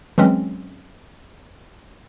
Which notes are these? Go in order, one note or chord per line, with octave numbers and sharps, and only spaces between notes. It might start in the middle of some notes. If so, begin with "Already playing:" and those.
E3 F#3 G#3 C4 C#4